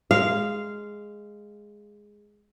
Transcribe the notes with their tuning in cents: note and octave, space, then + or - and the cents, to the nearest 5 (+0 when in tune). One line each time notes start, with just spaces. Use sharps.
G#3 +0 F5 -10